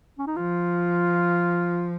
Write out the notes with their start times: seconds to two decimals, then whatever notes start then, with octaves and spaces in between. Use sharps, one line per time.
0.19 C#4
0.27 D#4
0.36 F3 F4